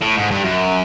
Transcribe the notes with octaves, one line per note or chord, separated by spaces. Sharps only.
A2
G#2
G2
F#2